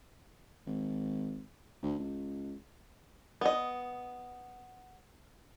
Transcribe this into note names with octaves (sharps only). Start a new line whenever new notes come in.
G#1
D2
C#2
B3 D#5